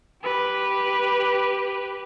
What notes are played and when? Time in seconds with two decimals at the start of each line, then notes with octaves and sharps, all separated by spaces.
0.23 G4 B4